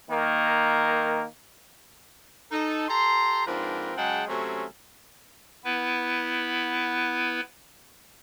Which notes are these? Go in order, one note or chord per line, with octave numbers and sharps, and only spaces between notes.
D#3 A#3
D#4 A4
G4 A4 A#5 C6
G#2 F3 C4 D4 A#4 B4
C#3 F#3 G#3 F#5 G5 A5
C3 F#3 A3 C4 C#4
B3 E4 B4